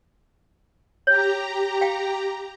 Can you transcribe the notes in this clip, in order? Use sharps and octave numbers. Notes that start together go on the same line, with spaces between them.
G4 C#5 A#5
F5 G5